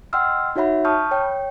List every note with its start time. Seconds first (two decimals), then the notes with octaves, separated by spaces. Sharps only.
0.13 D#5 F#5 G5 C6 E6 F6
0.56 D#4 F#4 C#5 E5 F#5 B5
0.85 A5 B5 C#6 D#6 F6 G6
1.11 C#5 G5